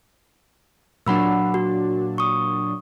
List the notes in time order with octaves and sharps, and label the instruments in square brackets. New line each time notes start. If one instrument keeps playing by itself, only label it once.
[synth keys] A#2 F#3 D4 [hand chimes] F#5 B5 E6
[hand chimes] F#4
C#6 D#6